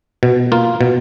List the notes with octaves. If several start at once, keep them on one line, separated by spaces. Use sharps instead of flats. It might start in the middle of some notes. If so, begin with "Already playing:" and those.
B2
A#3 F4
B2